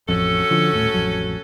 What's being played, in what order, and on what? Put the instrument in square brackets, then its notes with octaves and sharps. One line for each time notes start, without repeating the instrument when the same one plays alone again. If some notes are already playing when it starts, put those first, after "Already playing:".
[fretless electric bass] A1 F2 [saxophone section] C#4 F#4 A4
[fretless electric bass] D3 F3
D#1 A2
A1 F2 F#3